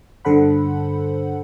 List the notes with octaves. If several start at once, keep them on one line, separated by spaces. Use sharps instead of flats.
G2 D3 A4 C5 F#5 B5